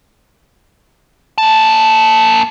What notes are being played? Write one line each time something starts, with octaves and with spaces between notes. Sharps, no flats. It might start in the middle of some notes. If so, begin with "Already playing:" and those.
A#3 A5